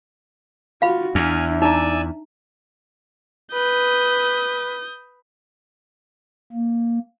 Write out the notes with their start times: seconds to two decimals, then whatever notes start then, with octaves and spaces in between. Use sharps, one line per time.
0.82 F4 F#4 F5 B5
1.15 E2 D4 E5 G#5 F6
1.62 D#4 D5 G#5 A#5 E6
3.53 B4 D#6 G6
6.52 A#3